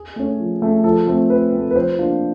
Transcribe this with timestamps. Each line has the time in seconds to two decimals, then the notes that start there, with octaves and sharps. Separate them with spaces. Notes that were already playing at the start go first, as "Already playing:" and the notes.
Already playing: G#4
0.16 A3 C#4
0.40 F3
0.62 A3 C#4
0.84 F3 A4
1.07 A3 C4
1.30 F3 B4
1.53 A3 C4
1.71 B4
1.76 F3 C5
1.99 A#3 D4 F4